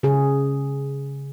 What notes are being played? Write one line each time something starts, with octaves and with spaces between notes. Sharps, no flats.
C#3 G#4